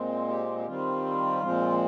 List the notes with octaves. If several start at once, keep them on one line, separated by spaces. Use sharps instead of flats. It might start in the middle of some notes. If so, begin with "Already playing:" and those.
Already playing: A#2 G#3 C4
G4
G4
D#3 G3 C4 F4
A#2 F3 G#3 C4